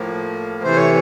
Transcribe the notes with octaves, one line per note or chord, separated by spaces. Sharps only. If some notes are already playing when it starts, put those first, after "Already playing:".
Already playing: A2 F3 A#3
C3 E3 A3 C5
C#5